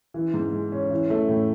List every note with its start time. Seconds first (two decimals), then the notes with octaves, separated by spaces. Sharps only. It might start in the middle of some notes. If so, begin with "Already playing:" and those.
0.14 E3
0.34 G#2
0.53 G#3
0.72 C#4
0.90 E3
1.10 A3
1.29 A2